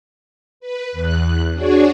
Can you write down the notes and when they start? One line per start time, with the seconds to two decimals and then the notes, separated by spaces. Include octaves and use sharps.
0.60 B4
0.92 E2 F#6
1.53 D4 F#4 G#4 C#5 D5